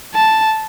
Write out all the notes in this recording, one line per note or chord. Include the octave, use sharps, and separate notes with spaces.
A5